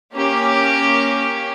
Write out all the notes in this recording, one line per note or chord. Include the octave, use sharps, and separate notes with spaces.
A#3 C#4 G4